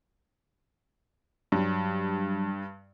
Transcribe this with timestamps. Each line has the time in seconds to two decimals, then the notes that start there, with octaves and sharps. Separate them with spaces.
1.52 G2 F#3 G3